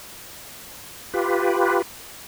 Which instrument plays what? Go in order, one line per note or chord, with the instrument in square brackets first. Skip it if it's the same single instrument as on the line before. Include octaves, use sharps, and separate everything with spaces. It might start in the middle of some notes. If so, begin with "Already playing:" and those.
[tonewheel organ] F4 G4 B4